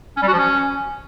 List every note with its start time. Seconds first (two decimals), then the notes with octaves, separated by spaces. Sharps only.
0.17 C#4
0.22 G3
0.28 F#4
0.33 F3
0.38 C#4